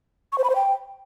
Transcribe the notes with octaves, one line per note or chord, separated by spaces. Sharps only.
C#6
C5
B5
C5
G5